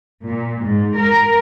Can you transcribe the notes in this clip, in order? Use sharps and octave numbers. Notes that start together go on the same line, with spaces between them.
A#2
G#2
A#4